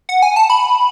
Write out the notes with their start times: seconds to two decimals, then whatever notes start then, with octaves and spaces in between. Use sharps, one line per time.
0.09 F#5
0.23 G#5
0.36 A5
0.50 B5